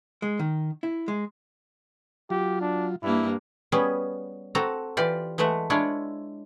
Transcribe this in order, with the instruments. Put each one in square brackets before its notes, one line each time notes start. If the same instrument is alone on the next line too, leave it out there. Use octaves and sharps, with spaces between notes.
[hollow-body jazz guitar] G#3
D#3
E4
G#3
[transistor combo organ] F#3 F4 [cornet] G4
[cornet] D4
[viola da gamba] G2 A#3 [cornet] E4
[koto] G3 B3 C#4 G#4
C4 F#4 A4 A#5
E3 F4 G4 D5
E3 G#3 A3 E5 F#5
G#3 D4 E4 F4 C#5 D5